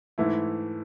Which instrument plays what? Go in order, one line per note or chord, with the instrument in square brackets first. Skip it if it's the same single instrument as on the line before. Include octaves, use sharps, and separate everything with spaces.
[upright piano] G#2 E3 A3 E4